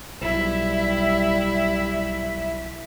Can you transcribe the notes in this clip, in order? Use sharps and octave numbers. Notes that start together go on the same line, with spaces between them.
B1 G3 E4 E5